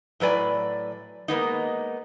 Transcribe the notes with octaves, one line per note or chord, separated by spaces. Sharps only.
A2 F#3 B4 D5 G#5
G#3 A#3 B3 D#4